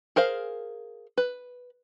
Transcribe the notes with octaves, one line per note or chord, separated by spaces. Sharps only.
G#4 A#4 C5 F5
B4